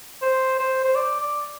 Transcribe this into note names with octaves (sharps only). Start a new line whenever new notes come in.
C5
C5
C5
D5
D5